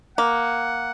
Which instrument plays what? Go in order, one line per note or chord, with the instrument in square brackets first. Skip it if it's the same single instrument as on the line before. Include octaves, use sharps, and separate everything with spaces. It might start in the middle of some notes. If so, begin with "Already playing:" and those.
[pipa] A#3 [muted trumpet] F#5